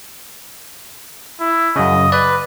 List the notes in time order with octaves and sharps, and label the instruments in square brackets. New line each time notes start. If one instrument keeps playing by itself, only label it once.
[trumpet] E4
[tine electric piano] F#2 C#3 [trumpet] D#5
[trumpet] B4 [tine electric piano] D5